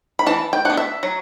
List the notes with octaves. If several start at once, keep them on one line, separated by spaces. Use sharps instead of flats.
B5
E3 A5
G5
B3 D4 F#5
E5
F#3